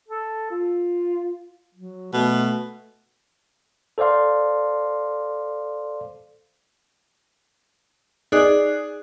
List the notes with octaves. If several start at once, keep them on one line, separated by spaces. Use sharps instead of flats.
A4
F4
F#3
B2 A3
A4 C5 D5 F5 C6
D#4 G#4 D5 F#6